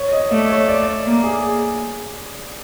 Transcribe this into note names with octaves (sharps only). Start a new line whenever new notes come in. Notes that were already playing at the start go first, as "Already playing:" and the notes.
Already playing: C#5
D#5
A3 D5
C#5
D5
A#3
G#4